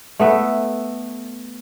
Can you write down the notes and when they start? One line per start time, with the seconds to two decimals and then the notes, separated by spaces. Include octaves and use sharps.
0.19 A3 B3 E5